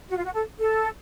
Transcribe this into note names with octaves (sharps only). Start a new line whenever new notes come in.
F#4
F4
F#4
A4
A4